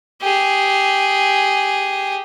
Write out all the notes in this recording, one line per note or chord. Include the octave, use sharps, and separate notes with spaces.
G4 G#4